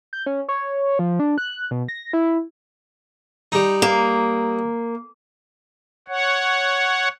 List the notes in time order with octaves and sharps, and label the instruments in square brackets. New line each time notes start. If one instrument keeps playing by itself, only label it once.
[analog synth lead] G6
C#4
C#5
F3
D4
F#6
B2
A#6
E4
[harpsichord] G3 D#4
[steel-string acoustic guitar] A#3
[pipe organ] C#5 F#5